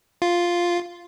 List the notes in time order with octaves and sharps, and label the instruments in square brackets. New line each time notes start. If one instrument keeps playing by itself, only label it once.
[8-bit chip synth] F4